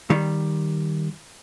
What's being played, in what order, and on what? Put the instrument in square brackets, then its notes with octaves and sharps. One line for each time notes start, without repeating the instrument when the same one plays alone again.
[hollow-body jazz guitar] D#3 G3